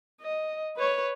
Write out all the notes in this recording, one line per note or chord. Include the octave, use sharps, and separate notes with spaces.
D#5
B4 C#5